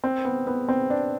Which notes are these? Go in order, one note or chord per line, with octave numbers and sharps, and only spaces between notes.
C4
B3
B3
C4
D4